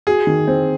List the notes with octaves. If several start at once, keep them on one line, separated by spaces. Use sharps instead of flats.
F#4 G#4
D#3
C4